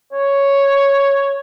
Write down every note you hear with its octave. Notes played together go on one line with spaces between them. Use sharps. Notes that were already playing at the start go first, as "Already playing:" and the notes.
C#5